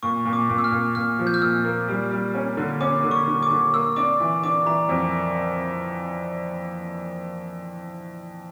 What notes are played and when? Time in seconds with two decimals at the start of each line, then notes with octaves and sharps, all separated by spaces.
0.03 A#2 C#6
0.25 A#2
0.33 D6
0.50 A#2
0.58 E6
0.64 F6
0.72 A#2
0.95 A#2 F6
1.19 F3
1.27 G6
1.34 F6
1.42 A#2 E6
1.64 A#3
1.88 G3
2.11 G3
2.34 C#4
2.57 D3
2.80 C#4 D6
3.04 D3
3.11 C#6
3.28 D3
3.43 D6
3.50 D3
3.74 A#3 E6
3.96 D4 D6
4.20 E3
4.43 D4 D6
4.66 E3 A#5
4.89 F2